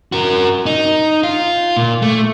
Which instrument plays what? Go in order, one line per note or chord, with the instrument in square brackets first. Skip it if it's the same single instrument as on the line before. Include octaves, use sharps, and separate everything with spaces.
[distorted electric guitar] F#4 A#4
D#4
F4
A#2
A3